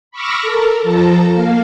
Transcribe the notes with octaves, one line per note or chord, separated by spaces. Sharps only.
B5 C#6 D6 E6 F6 A#6
A4 A#4
F3 A4 A5 A#5
A#3 F5